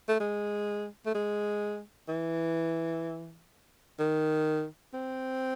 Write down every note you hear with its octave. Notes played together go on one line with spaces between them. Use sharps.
A3
G#3
A3
G#3
E3
D#3
C4